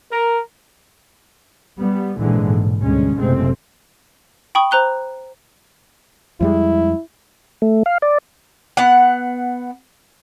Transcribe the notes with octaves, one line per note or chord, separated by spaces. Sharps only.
A#4
G3 B3
A#1 G#2 B2 D3 E3 G#3
B2
D2 G3 G#3 C#4
F#1 C3 G#3 A3 C4
G5 B5 C#6 D#6
C5 A#5 F#6 G7
F2 G3 G#3 E4
A3
F5
D5
B3 F#5